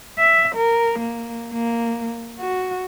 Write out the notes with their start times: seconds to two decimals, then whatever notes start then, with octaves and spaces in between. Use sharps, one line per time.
0.18 E5
0.55 A#4
1.00 A#3
1.52 A#3
2.39 F#4